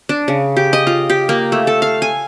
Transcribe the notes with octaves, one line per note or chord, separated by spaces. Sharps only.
D4
C#3
G4
D#5
F4
G4
A#3
A3
A4
F5
G#5